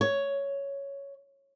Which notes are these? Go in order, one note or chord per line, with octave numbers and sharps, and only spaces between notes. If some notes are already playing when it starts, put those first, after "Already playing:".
C#5